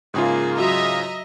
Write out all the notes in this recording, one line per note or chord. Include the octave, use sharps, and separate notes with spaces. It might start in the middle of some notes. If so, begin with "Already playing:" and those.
G#2 C#3 A#3 F4 G#4 E5 D#6
F#3 F#4 G#4 D#5 E5 A#5 D#6